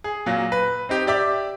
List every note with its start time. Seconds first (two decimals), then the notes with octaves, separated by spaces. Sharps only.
0.04 G#4
0.26 A#2 F#3 F4
0.52 B4
0.89 C4 D#4 G4
1.07 G4 D5 E5 D6